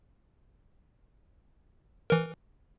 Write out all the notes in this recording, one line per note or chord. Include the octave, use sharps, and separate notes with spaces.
E3 A#4